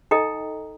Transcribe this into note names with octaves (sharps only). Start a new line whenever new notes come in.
D#4 A4 D#5 G5 A#5